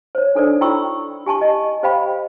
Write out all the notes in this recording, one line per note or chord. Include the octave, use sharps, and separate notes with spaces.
C5 C#5
D4 D#4 A4 A#4 C5 D5
E4 F#4 G5 B5 C#6 E6
G4 G#5 A5 C#6
D#5
G4 C5 D#5 F5 G5 B5